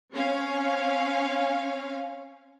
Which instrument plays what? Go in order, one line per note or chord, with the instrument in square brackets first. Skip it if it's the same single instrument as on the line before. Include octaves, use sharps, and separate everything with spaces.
[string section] C4 C#4 C#5 F5